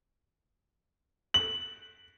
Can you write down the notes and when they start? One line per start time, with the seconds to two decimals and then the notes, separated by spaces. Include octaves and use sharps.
1.34 F#7